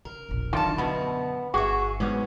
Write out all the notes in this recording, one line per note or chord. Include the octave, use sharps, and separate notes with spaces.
C#3 A#4
E1 A#1
F#2 D3 D#3 F#3 F4 A5
F#2 B2 D3 B3
G1 F#4 G#4 E5
G#2 F#3 B3 C#4